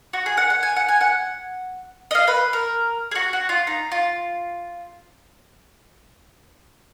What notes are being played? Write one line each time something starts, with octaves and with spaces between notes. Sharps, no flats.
F#4
G#4
F#5
F#5
G#5
F#5
G#5
F#5
D#5
F5
B4
A#4
G#4
F#4
F#4
F4
D#4
F4